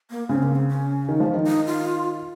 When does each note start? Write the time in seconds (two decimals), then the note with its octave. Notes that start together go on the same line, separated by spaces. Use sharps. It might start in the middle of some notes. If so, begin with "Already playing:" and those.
0.10 A#3
0.29 C#3 C4
0.43 A#3
0.56 C4
0.69 C#4
1.09 D#3
1.20 F3
1.34 D#3
1.47 D#4
1.66 F4